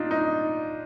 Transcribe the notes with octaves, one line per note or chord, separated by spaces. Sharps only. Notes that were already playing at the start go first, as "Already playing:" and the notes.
Already playing: A#2 D4 D#4 F4
D#4